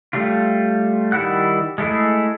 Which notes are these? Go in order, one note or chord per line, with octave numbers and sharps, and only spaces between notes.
G3 A3 F4
D#3 G3 E4 F#5 F#6
G#3 A3 E4 G#4